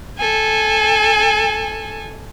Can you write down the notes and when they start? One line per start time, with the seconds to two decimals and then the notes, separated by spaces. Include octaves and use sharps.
0.18 A4 G#5